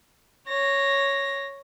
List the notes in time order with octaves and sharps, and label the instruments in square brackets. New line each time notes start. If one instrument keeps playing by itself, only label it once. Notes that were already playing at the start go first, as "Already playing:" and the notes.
[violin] C#5 A#6